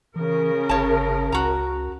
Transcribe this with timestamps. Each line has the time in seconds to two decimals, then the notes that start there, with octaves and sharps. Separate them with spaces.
0.16 C#3 E3 A#4
0.69 G1 C#5 A5
1.32 C#2 F#4 A#5